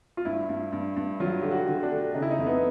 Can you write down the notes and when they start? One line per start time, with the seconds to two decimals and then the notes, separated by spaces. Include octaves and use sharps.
0.17 F4
0.25 G2 E4
0.49 G2
0.72 G2
0.96 G2
1.20 F#3 F4
1.42 D3 G4
1.51 F#4
1.68 D3
1.83 D4
1.91 A3
2.14 C#3 D#4
2.22 E4
2.31 D#4
2.39 F2
2.46 B3